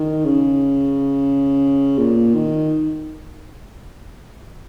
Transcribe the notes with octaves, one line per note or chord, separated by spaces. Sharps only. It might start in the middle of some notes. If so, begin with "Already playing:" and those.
Already playing: D#3
C#3
A#2
D#3